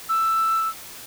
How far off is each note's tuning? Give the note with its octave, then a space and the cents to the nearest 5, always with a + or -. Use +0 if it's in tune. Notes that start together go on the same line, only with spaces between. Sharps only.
E6 +10